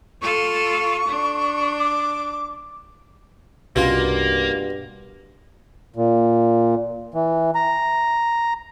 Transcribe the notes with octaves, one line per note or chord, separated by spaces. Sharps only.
F4 A4 C#6
D4
D6
C2 G2 B2 A#3 C#4 F4
A#2
E3
A#5